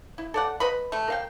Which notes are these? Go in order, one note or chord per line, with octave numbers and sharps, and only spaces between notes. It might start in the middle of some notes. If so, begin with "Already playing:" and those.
E4
A4 D5 F#5
B4 D#5 B5
A3
A#4 F5 G5